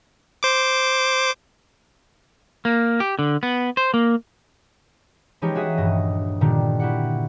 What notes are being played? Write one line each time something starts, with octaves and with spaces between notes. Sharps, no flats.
C5 D6
A#3
G4
D3
B3
C5
A#3
E3 F3 G#3 D#4 G4 C#5
F#4 G#4 E5 D#6
D#1 G2 D#5
A#2 D3 D#3 G3
E4 F#4 G4 F#5